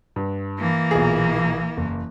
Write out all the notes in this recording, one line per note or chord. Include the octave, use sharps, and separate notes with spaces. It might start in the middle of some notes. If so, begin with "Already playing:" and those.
G2
E3 A#3
B1 A#2 G#4
F#1